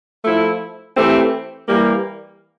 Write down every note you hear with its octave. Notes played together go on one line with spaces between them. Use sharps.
F3 A3 E4
E3 A3 C4 G4
E3 G3 A#3